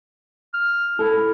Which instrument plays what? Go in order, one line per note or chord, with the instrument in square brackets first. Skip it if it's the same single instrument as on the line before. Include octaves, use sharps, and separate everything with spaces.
[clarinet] F6
[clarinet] E4 [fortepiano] A4